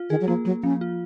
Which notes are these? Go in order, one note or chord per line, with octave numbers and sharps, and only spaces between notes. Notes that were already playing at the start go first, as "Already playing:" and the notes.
Already playing: F4
D#3 G#4
F#3
F3 A#3
F#3 A#3
F3 C#4
F4